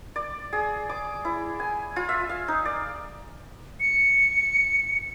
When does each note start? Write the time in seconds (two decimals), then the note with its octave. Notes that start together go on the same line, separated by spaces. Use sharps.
0.16 D5
0.53 G#4
0.89 D6
1.25 E4
1.60 G#5
1.96 F4
2.09 E5
2.29 F5
2.48 D#4
2.65 D5
3.80 C#7